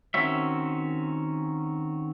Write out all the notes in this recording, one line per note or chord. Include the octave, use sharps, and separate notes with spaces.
D#3 C4 C#4 F#4 E5